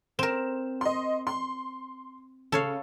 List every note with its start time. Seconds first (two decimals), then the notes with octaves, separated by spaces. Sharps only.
0.19 C4 A#4 E7
0.81 D#5 C6
1.27 C6
2.52 C#3 A4 C#5 F5